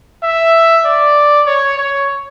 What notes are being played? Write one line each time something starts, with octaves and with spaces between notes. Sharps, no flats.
E5
D5
C#5
C#5